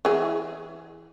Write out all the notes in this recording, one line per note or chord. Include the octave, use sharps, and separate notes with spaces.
E3 G#4